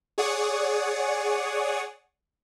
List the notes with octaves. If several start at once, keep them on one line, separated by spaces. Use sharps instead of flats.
G#4 C#5 D5 F#5 C#6 D#6